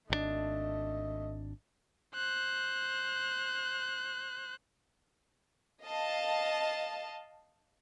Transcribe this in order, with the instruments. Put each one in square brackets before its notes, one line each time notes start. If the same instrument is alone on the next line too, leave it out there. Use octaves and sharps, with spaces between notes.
[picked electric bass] G#1 C3 D4 [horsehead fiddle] A3 D#5
[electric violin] C5 F#6
[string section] D#5 F5 A5